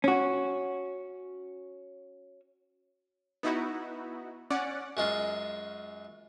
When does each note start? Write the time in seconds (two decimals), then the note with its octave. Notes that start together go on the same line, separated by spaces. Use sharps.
0.04 C#4 F#4
3.43 B3 D#4 E4 F#4
4.50 C#4 D5 F#5
4.97 F#2 G#3 F4